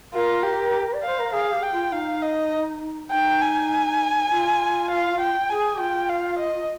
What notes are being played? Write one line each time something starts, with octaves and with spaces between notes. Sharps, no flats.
F4 A#4
G4
D5
C5 F5
A#4
G#4 F5
G4
G5
F4
D#4 F5
D#5
D#4 G5
G#5
F4
F5
G5
G#4 G#5
F4 G5
F5
D#5